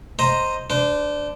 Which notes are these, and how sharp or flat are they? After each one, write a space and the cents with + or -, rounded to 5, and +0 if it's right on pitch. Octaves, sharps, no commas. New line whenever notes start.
C5 +0 D#5 +0 A#5 +0
D4 +0 C5 -30